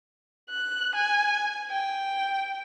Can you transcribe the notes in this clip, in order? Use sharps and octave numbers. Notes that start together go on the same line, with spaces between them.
F#6
G#5
G5